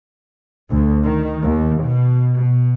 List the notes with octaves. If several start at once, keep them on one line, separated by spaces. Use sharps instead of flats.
D2
D#3
D#2
B2
B2